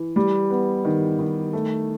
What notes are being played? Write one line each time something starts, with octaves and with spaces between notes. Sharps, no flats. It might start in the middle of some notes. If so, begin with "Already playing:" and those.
Already playing: E3
G3
B3
D#3
D#3
A3